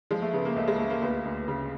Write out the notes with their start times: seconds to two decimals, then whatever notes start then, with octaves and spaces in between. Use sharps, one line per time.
0.11 F3 G#3
0.22 A3
0.33 C#3 B3
0.45 A#3
0.56 C#2 A3
0.68 G#3
0.79 C#2 A3
0.90 A#3
1.02 D2 B3
1.25 D2
1.48 C#3